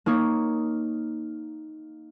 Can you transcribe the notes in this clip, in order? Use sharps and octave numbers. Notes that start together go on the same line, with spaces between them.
A#3 D#4 C#5